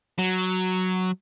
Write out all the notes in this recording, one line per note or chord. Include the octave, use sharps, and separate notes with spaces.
F#3